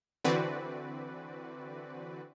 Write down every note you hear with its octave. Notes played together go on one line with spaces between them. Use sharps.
D3 E3 C4 F#4 B4 D5